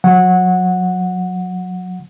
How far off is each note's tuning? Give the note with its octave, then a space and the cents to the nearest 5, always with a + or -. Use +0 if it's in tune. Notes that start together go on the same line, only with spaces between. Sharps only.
F#3 -25 F#5 -10